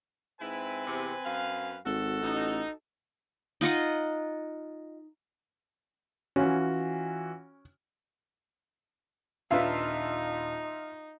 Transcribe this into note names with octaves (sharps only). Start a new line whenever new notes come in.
G#2 C4 E4 B4 G#5
E2 C3
F#2 F5
G#1 F#4 A4
A1 D#4
D#4 F4 D#5 F#5
E3 C#4 F4 F#4
D#1 D4 D#4 F4 B4 E5 F5